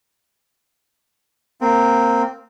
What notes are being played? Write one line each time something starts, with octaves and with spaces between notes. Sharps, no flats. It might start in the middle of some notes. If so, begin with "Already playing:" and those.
A#3 C4